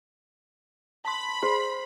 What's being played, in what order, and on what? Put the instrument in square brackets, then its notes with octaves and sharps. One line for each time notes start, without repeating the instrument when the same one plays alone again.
[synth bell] A5 C6 [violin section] B5
[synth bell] G#4 [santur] C5